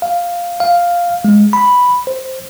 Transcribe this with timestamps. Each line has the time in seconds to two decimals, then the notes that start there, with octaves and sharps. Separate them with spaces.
0.02 F5
0.60 F5
1.25 G#3
1.53 B5
2.07 C5